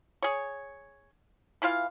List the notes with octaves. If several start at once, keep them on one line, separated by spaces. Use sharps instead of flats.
G#4 C#5
E3 E4 F4 F5